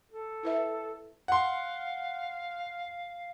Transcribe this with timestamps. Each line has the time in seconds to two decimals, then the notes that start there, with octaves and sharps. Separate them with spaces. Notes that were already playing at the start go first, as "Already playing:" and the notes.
0.11 A4
0.43 E4 B4 E5
1.28 F5 F#5 C6